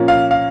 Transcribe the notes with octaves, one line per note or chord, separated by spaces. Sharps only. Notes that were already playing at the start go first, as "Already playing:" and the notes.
Already playing: A#2 F3 A#3 C#4
F5
F5